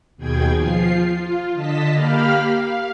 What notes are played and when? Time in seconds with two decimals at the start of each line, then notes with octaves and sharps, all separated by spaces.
0.17 D#2 B2 G#4 G5 G#6
0.58 F3 F4 C7
1.14 F4
1.54 D3 D#5 A5 B6
1.94 A#3 G4 F5 B5 F6
2.48 F5